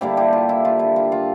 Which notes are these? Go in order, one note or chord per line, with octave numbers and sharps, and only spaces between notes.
D3 G3 A#3 D4 E4 G4
E4 G4
F4
E4
F4
E4
F4
F4